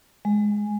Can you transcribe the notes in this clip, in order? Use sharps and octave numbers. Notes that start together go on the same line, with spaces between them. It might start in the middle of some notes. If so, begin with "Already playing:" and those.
G#3